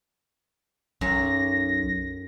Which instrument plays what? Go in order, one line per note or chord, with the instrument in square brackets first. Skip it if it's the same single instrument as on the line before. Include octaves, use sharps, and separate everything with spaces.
[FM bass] B1 [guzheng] F#2 [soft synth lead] A#6